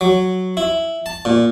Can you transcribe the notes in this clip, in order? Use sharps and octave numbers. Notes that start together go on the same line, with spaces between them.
F#3
E4
A5
A#2